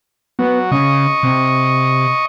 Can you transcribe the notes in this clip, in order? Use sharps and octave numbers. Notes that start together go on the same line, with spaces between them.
F#3 B3
C#3 D#5 C#6
C3